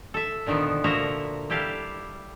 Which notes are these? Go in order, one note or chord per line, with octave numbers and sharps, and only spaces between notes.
A4 E5
A#2 D3 D#3 F3 B3
D3 F3 A#3 F#4 E5 A#5
G3 E4 G4 A4 F5